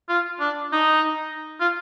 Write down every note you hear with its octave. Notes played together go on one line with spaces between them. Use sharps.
F4
D4
D#4
F4